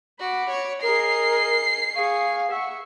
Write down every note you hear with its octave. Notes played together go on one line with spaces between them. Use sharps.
F#4 B5 D6
C#5
G#4 A#4 D#5 C7
G#4 F5 C#6
E5 F#5 C#6